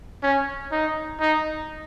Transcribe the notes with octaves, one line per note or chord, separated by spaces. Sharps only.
C#4
D#4
D#4